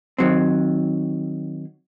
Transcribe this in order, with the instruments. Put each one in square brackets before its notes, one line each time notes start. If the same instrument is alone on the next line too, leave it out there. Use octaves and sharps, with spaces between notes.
[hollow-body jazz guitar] D#3 F#3 C4